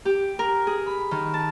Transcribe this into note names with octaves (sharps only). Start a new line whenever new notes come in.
G4
A#4
G#4
B5
D#3
A5